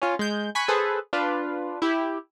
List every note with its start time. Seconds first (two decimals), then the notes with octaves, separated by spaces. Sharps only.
0.02 C#4 F4
0.19 G#3 G6
0.55 G#5 B5 C#6 F#6
0.68 G#4 A4 B4 C5
1.13 D4 F4 B4
1.82 E4 G4